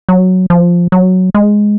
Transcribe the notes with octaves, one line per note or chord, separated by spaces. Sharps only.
F#3
F3
F#3
G#3